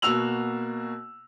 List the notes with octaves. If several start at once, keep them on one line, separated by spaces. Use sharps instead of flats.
B2 A#3 F#4 E6 F7 F#7